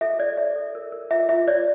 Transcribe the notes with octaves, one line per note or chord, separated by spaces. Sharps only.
A4 E5
C#5 D5
C#5 E5
A4
A#4
A#4
F4 E5
F4 E5
C#5 D5